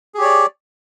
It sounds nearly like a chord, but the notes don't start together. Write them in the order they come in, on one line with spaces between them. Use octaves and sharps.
G#4 G4 C#5 D5